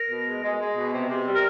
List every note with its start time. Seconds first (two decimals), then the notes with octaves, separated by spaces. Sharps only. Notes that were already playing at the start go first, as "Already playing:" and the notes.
Already playing: A#4
0.10 B2
0.27 G#3
0.43 G#3
0.60 G#3
0.76 B2
0.93 C3
1.09 C3
1.26 G3
1.34 A#4